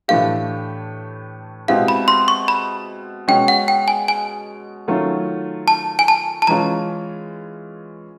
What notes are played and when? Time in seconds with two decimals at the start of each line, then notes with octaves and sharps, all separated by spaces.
0.08 A2 E3 A3 D4 G4 F5
1.68 B2 G#3 C4 E4 G4 F5
1.88 B5
2.08 C6
2.28 C#6
2.48 B5
3.28 B2 G#3 C#4 G5
3.48 F#5
3.68 G5
3.88 G#5
4.08 G#5
4.87 D#3 F#3 A3 C#4 F4
5.68 A5
5.99 G#5
6.08 A5
6.42 A5
6.47 E3 G#3 C#4 F4 A#5